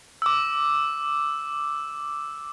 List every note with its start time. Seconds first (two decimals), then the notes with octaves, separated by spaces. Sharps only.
0.22 D6 E6